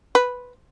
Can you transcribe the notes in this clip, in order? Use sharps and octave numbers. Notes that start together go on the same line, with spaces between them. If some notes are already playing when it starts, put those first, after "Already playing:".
B4